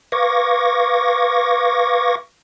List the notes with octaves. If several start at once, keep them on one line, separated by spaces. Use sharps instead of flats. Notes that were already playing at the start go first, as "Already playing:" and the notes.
B4 F5 C#6 D6 G#6 A#6